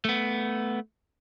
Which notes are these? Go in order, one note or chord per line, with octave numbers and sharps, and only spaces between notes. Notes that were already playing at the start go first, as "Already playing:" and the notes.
A3 B3